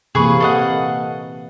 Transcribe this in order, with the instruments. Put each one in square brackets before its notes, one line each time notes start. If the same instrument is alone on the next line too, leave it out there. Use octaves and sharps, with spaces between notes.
[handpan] C3 E3 A#3 [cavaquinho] G#4 B4 C#6
[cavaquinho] A4 D#5 F#5